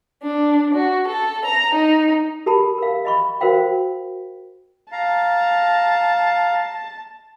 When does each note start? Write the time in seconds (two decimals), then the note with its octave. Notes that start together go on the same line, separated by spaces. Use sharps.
0.22 D4
0.75 F#4
1.08 A4
1.46 A#5
1.77 D#4
2.46 G4 A4 A#4 A5 B5
2.78 A#4 F5
3.05 D#5 B5 C#6
3.41 F#4 A#4 C5 F5 G5
4.92 F5 A5 A#5